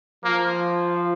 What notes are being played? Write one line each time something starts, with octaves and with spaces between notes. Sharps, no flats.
F3 A#3